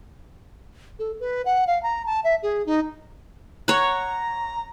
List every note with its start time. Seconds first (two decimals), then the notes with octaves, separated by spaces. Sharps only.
0.99 A4
1.20 B4
1.46 F#5
1.67 F5
1.83 A#5
2.06 A5
2.24 E5
2.43 G#4
2.66 D#4
3.68 C#5 F#5 A#5